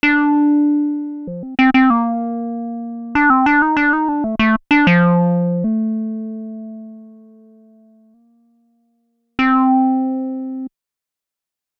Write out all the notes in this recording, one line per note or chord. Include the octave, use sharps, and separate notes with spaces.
D4
F3
C4
C4
C4
A#3
D4
C4
D4
D#4
D4
D#4
D4
A3
A3
D4
F3
A3
A#3
C4